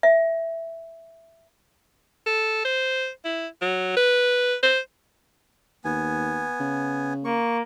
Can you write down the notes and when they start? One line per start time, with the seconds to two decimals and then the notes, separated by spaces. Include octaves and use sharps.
0.03 E5
2.27 A4
2.65 C5
3.25 E4
3.62 F#3
3.97 B4
4.63 C5
5.84 D#2 B3 G#5
6.60 C#3
7.25 A#3 C#6